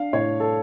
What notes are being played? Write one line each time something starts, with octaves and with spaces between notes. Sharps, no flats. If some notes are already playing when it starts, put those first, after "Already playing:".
Already playing: D4 F5
A2 C#5
A4